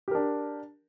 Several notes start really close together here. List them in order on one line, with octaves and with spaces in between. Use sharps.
G4 A#4 D4